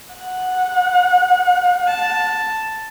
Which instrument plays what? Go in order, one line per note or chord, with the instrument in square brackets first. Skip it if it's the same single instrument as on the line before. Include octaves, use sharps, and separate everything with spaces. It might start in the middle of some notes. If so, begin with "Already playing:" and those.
[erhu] F#5
[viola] A5